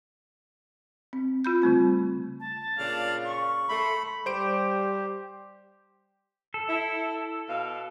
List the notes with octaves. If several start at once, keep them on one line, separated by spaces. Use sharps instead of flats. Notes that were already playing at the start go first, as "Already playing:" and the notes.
C4
F4 B5 G6
C#3 G3 A3 C4
A5
A#2 C#3 D4 F5
C#6
A3 B5 C6
G3 G4 C5 D7
A4
E4
B2 F5